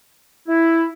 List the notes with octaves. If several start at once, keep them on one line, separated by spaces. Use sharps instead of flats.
E4